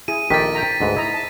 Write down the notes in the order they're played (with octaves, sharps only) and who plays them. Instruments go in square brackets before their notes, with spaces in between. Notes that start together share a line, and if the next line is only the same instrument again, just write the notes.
[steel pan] E4 G#4 [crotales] D#7
[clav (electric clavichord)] A#1 D#3 A4 [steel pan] G4 [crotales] A6 B6
[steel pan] G5 A#5
[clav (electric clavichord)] D2 G#2 B4
[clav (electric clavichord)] E4 [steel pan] D#5 A#5
[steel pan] A5